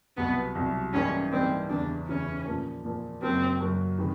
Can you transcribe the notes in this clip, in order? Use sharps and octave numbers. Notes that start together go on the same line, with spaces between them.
C2 B2 F#3 B3
C2 B2 F#3
G#2 E3 G3 A#3 C#4 D#4
G#2 E3 G3 A#3 C4 D#4
E2 C#3 E3 D4
E2 C#3 E3 C#4
A#2 F3 A#3
A#2 F3 A#3
F#2 C#3 F#3 A#3 C4
F#2 C#3 F#3 A#3
C3 D#3 G#3 B3